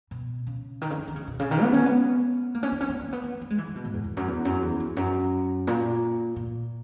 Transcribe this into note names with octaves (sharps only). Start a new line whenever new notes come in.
B2
C#3
D#3
C#3
E3
D#3
C#3
B2
C#3
D#3
B3
C#4
B3
A#3
C#4
B3
C#4
B3
A#3
B3
B3
A#3
G#3
E3
D#3
B2
G#2
E2
E2
F#2
E2
F#2
E2
E2
F#2
A#2
A#2